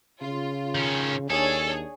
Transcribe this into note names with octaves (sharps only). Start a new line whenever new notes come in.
C#3 F4
D#3 C#4
D#2 D4 G#4 A4 C#5